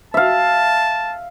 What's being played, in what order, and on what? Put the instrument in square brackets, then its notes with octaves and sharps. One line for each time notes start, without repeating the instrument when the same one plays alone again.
[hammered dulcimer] E5 F5 [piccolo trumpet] A5